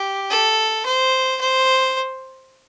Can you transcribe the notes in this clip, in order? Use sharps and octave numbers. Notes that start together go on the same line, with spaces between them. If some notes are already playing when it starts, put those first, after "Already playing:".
Already playing: G4
A4
C5
C5